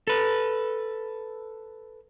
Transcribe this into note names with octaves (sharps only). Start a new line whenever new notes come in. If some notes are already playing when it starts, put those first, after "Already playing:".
A4 B4